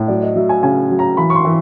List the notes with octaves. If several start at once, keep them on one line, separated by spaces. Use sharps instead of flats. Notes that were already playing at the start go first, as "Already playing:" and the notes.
Already playing: A2
F#3 D5
D#5
F#3 E5
G#5
C#3 G#5
F#3
A#5
E3 B5
C#6
C6
E3